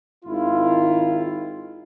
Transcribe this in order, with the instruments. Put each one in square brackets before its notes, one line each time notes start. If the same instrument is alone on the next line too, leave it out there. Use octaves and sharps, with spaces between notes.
[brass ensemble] G#1 D#3 E4 F4